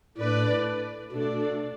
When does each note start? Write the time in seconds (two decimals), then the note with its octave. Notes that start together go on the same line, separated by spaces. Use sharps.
0.18 A2 A3 D4 B4 D5
1.12 B2 A3 D4 F#4 A4 D5